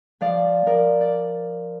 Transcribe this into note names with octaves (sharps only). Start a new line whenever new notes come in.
F3 D5 F5
F3 A#4 D5
D5